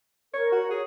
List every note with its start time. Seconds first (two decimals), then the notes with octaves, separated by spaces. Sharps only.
0.34 A#4 C#5
0.52 F#4
0.70 G#4 C#5